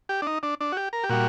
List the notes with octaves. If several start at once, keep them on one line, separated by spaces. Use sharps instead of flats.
G4
D4
D#4
D4
D4
F#4
G4
A#4
G4
A#2 G3 F#4